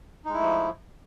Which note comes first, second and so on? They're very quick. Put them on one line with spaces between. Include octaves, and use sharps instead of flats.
D#4 G#3 E4 A3 F3